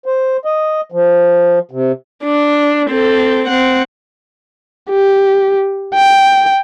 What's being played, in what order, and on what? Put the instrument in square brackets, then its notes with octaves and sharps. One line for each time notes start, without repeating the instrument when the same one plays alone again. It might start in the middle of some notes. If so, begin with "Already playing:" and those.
[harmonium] C5
D#5
F3
C3
[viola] D4
C4 A4
C4 F#5
[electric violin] G4
G5